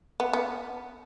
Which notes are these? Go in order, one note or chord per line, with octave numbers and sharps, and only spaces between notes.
B3
B3